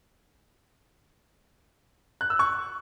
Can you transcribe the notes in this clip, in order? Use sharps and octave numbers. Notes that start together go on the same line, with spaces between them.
F#6
E6
C#6